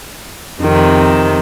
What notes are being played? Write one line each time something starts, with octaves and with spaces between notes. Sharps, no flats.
F2 C3 D#3